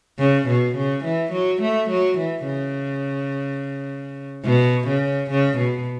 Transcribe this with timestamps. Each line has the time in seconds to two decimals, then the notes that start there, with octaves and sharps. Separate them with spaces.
0.19 C#3
0.48 B2
0.75 C#3
1.04 E3
1.32 F#3
1.62 A3
1.90 F#3
2.18 E3
2.46 C#3
4.44 B2
4.88 C#3
5.30 C#3
5.58 B2